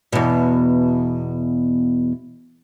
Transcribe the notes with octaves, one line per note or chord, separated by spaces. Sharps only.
E2 B2